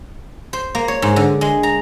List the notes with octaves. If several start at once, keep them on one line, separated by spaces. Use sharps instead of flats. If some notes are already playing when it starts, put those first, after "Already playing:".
C5
A#3
C#5
G#2
D3
G#3
A#5